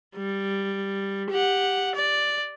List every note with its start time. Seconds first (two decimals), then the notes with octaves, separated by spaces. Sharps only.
0.16 G3
1.30 G4 F#5
1.95 D5